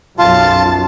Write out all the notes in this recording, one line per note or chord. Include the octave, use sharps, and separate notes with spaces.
B1 F#2 F4 A5